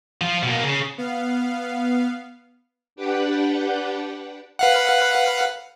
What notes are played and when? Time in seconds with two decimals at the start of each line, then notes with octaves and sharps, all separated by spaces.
0.21 F3 F4
0.43 B2 A#3
0.63 C#3
0.98 B3 F5
2.96 D4 G4 B4 F#5 G5
4.59 B4 F5 F#5